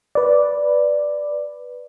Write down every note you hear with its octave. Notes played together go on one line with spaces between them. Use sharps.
B4 D5